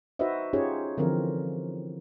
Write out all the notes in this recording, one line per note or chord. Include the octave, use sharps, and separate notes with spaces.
D#4 F#4 B4 C5 D#5 E5
C#4 D#4 F4 G4 G#4 C#5
D3 E3 F3 C4 A#4